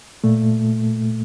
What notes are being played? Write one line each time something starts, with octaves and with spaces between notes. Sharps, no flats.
A#2 A3